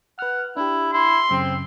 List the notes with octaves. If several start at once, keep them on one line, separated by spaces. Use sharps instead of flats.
B4 F#5 F6
D4 E4 G4
E4 C6
F#2 C#3 C4